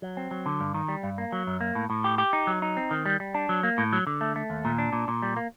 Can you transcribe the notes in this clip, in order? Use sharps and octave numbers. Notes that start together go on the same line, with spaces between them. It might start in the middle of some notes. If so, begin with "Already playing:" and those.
F#3
C4
F#3
D3
G2
D#3
G3
G2
A#3
F#3
F#2
A#3
A2
A2
G4
G4
D#4
F#3
D#4
C4
D#3
G3
G3
D4
F#3
A#3
A2
F#3
D3
A3
A3
D#2
A#2
D4
A#2
A#2
G3
A#3